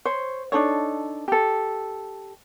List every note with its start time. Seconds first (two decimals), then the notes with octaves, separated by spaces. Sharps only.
0.05 C5 C#5
0.52 D4 D#4 A4 C#5
1.28 G4 A4